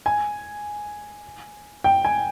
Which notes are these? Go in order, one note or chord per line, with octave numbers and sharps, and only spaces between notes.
G#5
G5
G#5